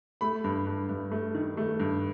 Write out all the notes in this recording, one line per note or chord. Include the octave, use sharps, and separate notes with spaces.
A3 B5
G2
G2
G2
A3
D#3
A3
G2